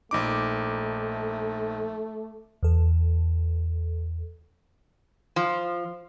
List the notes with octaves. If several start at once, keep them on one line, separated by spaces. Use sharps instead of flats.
A#1 A3 D#4 D6
E2 A4
F3